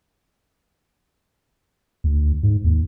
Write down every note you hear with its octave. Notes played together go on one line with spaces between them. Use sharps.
D2
G#2
D#2